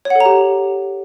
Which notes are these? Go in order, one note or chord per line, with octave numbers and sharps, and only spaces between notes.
C#5
F#5
A4
A#5
G4